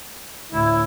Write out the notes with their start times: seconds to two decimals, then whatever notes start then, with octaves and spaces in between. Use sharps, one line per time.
0.52 D2 A2 E4